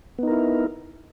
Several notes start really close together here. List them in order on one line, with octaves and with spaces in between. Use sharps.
B3 D#4 A#4 E4